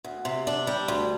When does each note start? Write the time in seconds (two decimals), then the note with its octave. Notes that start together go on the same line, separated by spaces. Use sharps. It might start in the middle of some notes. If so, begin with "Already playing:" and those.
0.04 D2
0.25 C3
0.47 D4
0.67 G3
0.88 D2